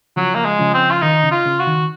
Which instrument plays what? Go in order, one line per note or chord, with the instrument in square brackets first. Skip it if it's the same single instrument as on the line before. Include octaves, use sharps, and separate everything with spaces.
[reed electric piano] C#3 F3 [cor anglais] F#3
[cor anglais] A#3
G#3
[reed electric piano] C#3 F3
[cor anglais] C4
F4
[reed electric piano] D#3 [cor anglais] D#4
[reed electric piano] C#3
[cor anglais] F4
[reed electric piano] C#3
[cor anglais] F#4
[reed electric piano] D#3